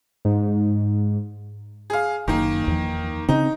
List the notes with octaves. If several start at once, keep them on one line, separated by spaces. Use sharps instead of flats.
G#2
G#4 F5
F#1 D#3 A#3
E2 F3
C#3 C4 D#4